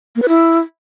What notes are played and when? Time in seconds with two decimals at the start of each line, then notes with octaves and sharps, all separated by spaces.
0.16 A#3
0.22 B4
0.29 E4